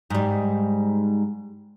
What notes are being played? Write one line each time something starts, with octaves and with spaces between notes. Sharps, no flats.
G#2 G3